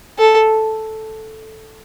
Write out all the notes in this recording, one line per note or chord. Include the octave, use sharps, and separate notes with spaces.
A4